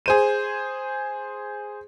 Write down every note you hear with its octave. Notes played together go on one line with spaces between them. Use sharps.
G#4 C5 D#7